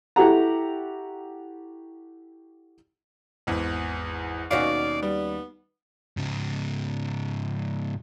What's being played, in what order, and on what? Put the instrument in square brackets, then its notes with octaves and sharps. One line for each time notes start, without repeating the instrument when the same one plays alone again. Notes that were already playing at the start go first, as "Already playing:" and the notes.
[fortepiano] E4 F#4 G4 A4 F#5 A#5
[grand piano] G#1 E2
[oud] D#2 C#4 F#4 [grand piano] B2 F5 [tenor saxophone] D5
[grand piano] G3 [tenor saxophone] B3
[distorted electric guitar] G#2 C#3